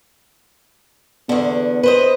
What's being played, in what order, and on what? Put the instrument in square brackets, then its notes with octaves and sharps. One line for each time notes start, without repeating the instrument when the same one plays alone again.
[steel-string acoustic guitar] E2 D3 [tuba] B3
[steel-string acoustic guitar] B4 C5 D#5